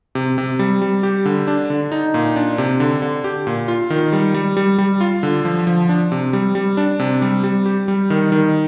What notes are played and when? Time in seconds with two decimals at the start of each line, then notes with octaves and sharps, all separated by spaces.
0.15 C3
0.38 C3
0.59 G3
0.82 G3
1.03 G4
1.25 D3
1.47 D4
1.70 D3
1.92 D#4
2.14 A#2
2.36 D4
2.58 C3
2.80 D3
3.02 D3
3.24 G4
3.47 A#2
3.68 F4
3.90 D#3
4.13 G3
4.34 G3
4.57 G3
4.78 G3
5.01 F4
5.23 D3
5.45 F3
5.67 F3
5.89 D4
6.12 C3
6.33 G3
6.55 G3
6.77 D4
6.99 C3
7.22 G3
7.44 G3
7.66 G4
7.88 G3
8.10 D#3
8.32 D#3